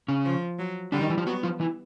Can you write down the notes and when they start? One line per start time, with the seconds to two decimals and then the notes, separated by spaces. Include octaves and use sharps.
0.08 C#3 C#4
0.25 F3
0.59 F#3
0.92 D3 G3 D4
1.01 D#3 D#4
1.10 E3 E4
1.17 F3 F4
1.26 F#3 B3 F#4
1.43 F3 F4
1.60 E3 E4